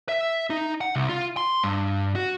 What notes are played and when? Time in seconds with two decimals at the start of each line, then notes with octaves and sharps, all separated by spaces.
0.09 E5
0.50 D#4
0.81 F#5
0.96 C2
1.09 F4
1.37 C6
1.64 G2
2.16 F#4